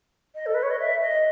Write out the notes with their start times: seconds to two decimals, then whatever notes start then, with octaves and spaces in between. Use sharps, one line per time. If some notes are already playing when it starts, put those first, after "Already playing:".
0.35 D#5
0.46 A4
0.54 B4
0.63 C#5
0.71 D#5
0.80 E5
1.02 D#5